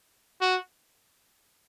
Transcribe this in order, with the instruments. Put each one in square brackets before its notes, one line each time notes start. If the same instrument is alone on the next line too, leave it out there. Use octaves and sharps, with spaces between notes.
[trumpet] F#4